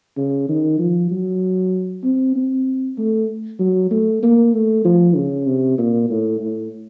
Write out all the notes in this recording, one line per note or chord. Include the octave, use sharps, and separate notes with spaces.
C#3
D#3
F3
F#3
C4
C4
A3
F#3
A3
A#3
A3
F3
C#3
C3
A#2
A2
A2